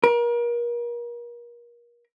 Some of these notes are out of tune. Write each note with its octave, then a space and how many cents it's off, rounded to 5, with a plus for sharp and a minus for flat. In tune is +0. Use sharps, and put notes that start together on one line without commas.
A#4 +35